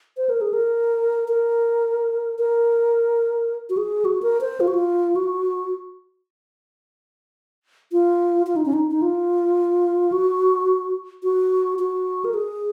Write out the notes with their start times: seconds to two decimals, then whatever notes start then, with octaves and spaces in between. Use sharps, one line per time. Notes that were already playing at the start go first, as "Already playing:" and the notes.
0.17 C5
0.29 A#4
0.41 G#4
0.53 A#4
1.29 A#4
2.39 A#4
3.70 F#4
3.77 G#4
4.05 F#4
4.22 A#4
4.41 C5
4.60 F4
4.68 F#4
4.74 F4
5.16 F#4
7.92 F4
8.47 F4
8.56 D#4
8.66 C#4
8.73 D#4
8.91 D#4
9.02 F4
10.12 F#4
11.24 F#4
11.79 F#4
12.25 A#4
12.34 G#4